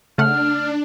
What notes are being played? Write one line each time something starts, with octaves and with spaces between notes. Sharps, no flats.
C#3 A3 D4 F#5 F6